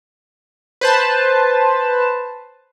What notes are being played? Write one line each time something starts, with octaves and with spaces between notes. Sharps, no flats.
B4 C5 A5